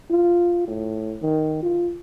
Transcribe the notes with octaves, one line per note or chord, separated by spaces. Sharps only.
F4
A2
D#3
F4